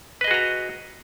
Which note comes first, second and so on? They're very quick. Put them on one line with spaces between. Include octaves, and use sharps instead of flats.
B4 D#5 G#4 F#4 A#5